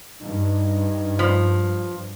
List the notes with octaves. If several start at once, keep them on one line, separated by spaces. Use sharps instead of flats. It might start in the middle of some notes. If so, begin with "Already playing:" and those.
G2 D#4
F3